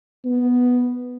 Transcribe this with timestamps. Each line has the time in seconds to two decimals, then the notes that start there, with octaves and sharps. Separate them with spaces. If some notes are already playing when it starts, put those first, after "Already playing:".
0.25 B3